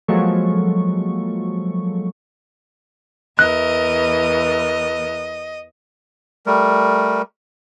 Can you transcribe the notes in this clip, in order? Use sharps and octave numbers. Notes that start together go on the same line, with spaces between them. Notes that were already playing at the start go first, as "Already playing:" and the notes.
F3 F#3 G#3 A#3 A4 C#6
E2 E3 A#4 D#5 F#6
G3 A3 A#4